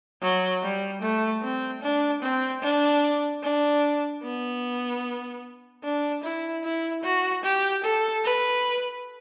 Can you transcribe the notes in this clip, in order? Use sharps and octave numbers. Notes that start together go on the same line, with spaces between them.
F#3
G3
A3
C4
D4
C4
D4
D4
B3
D4
E4
E4
F#4
G4
A4
B4